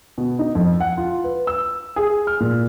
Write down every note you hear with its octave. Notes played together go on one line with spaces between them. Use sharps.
B2
D#4
F2
F#5
F4
B4
E6
G#4
F6
A#2